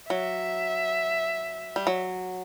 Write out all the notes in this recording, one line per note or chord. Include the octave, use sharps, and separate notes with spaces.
F#3 E5
G3
F#3